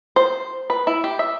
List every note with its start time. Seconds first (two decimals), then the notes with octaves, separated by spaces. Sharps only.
0.16 C5
0.70 B4
0.87 E4
1.04 G4
1.19 E5